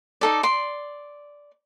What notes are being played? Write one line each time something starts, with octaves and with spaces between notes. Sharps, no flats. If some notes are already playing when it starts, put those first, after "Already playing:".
D#4 A4 D5
D5 C6